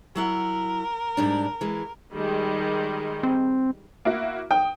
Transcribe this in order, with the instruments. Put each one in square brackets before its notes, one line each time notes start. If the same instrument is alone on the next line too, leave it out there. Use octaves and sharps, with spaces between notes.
[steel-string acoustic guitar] F#3 E4 F#5 [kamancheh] A#4
[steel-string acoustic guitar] G#2 G3 D4
E3 G#3
[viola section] D#3 G3 G#3
[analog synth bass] C4
[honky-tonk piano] A#3 E4 F#4
[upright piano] G5 [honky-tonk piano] D#6